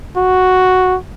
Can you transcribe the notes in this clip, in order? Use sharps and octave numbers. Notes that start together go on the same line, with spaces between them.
F#4